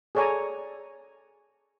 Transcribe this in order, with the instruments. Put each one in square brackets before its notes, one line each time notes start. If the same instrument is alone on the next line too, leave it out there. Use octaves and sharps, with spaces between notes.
[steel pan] G#4 A4 C#5 D5 G#5 A#5